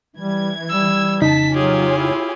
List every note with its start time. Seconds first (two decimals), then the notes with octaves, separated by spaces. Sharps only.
0.17 E3 G3 G#6
0.70 G3 E6
1.22 F2 C#3 D#4 A5 B6
1.54 F#3 F4 G4 G#4 C#5 G#5
1.93 E4